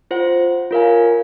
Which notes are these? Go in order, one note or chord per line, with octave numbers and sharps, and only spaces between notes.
F4 C5 F#5
F4 A#4 C#5 F5 G#5